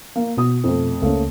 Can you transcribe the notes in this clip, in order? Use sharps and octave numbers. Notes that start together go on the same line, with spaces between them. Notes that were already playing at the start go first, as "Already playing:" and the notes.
A#3
B2 F#4 D#6
F2 A3
C#2 A3 A#3 C#4